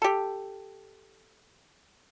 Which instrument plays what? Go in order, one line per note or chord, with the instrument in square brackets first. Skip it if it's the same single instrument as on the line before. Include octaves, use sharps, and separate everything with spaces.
[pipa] G4 A4